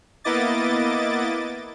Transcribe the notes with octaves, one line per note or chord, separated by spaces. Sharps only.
A#3 B3 E4 D#5 D6 A6